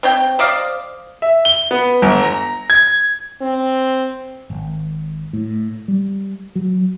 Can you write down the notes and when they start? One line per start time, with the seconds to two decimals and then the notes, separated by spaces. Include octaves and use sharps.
0.03 C4 C#5 G5
0.39 C5 D5 D#5 F5
1.22 E5
1.45 G7
1.71 B3
2.02 G1
2.23 A#5
2.70 G#6
3.42 C4
4.50 G#1
5.33 A2
5.88 G3
6.55 F#3